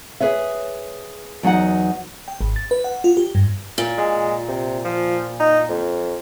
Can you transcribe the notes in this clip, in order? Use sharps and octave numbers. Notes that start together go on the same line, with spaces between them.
G#4 B4 C#5 E5
E2 F#3 D#4 F#5
G5
G#1
A6
B4
F#5
F4
G4
G2
A#2
G#3
C3
F3
D#4
F2